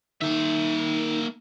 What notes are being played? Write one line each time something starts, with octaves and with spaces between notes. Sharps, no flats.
D#3 A#3 E5